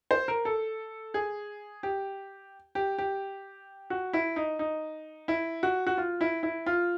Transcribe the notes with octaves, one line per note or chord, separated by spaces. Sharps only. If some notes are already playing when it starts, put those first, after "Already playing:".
C5
A#4
A4
G#4
G4
G4
G4
F#4
E4
D#4
D#4
E4
F#4
F#4
F4
E4
E4
F4